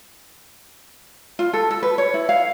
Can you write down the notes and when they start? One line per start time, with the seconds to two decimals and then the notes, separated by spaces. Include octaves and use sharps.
1.39 F4
1.53 A4
1.71 A4
1.83 B4
1.98 C#5
2.14 E4
2.29 F5